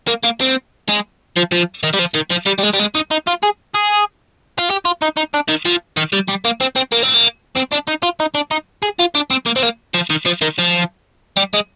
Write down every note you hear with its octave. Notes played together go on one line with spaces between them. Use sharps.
A#3
A#3
C4
G#3
F3
F3
D#3
G3
F3
D#3
F3
G3
G3
G#3
G3
G#3
D#4
D#4
F4
G#4
G#4
F4
G4
F4
D#4
D#4
D4
D#3
F3
D#3
G3
G3
A#3
C4
C4
A#3
C4
A#3
C4
D4
D#4
F4
D#4
D4
D#4
G#4
F4
D4
C4
A#3
C4
A#3
F3
D#3
F3
D#3
F3
G3
G#3